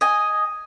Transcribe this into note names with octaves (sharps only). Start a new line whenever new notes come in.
D#5 G#5